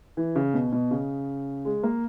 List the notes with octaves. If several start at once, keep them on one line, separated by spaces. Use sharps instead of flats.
E3
C#3
B2
B2
C#3
G#3
A#3